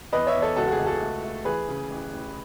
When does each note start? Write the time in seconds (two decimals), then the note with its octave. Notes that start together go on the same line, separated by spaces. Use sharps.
0.13 E2 B4 D#5
0.27 C#5 E5
0.35 E2
0.42 A4 C#5
0.56 C#2 F#4 A4
0.67 F#4
0.72 G#4
0.79 C#2
0.86 F#4 A4
1.02 A3
1.23 A3
1.45 E3 G#4 B4
1.69 C#3
1.90 A1
2.13 A1